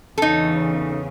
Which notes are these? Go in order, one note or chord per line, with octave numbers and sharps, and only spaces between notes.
E2 C#3 D#4 A4